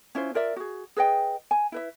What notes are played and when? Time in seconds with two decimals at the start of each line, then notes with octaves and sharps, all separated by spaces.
0.15 C#4 E4 F4 C5
0.34 F4 A#4 D5 E5
0.56 F#4 G#4
0.96 G#4 B4 D#5 G5
1.51 G#5
1.72 E4 B4 E5